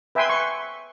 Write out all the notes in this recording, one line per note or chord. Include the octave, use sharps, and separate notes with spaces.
B4 E5 G5 G#5 C6
C6 C#6